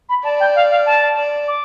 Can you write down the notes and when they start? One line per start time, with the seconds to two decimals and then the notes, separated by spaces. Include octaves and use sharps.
0.09 B5
0.24 D5 A5
0.40 G5
0.55 F5
0.71 F5
0.86 A5
1.17 D5
1.48 D6